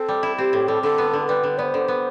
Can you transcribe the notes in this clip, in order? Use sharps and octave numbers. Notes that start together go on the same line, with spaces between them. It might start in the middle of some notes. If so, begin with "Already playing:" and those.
Already playing: C4 A4
G3
E4
C4 G4
A2
G3 A4
D3 A4
B3
D3
G3 B4
D3
B3 C5 D5
D3
B3